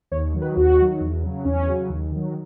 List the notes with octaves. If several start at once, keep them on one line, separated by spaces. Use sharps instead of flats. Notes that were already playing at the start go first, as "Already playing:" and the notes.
D#2 C#5
D#3 F#3
B4
D#2 F#4
D#3 F#3
E2
C#3 F#3
E2 C#4
C#3 F#3
D#2
D#3 F#3